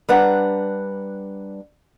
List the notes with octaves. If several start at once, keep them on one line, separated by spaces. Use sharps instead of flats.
G3 D4 B4 F#5 A#5